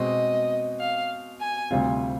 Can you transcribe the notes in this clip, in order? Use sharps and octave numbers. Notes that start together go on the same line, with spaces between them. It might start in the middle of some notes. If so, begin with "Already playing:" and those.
Already playing: B2 G#3 C4 D#5
F5
G#5
D2 C3 G3 C4 F4